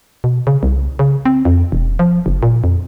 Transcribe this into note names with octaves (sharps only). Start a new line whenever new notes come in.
B2
C#3
C2
C#3
C4
F2
E1
F3
F#1
A#2
F2